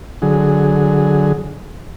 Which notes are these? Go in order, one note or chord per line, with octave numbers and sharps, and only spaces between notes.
D3 F#3 G#4